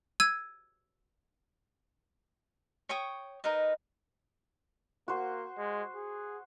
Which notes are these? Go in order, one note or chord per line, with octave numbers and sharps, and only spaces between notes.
E6 G#6 D#7
C#5 G5 C#6 D#6
D#4 A#4 B4 D#5
A#3 F#4 C5
G#3
G#4